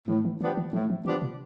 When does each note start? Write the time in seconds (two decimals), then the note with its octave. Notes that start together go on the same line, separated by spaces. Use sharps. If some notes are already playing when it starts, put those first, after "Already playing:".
0.08 A2 E3
0.25 E3
0.40 E3 F3 B3 D4 G4
0.57 E3
0.73 A2 F3
0.90 F3
1.05 E3 F3 B3 D4 G4
1.22 C3